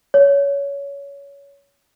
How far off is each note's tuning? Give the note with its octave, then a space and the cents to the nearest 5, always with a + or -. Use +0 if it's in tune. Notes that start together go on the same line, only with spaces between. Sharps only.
C#5 +20